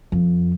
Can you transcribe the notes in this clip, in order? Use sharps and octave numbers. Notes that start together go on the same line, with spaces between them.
F2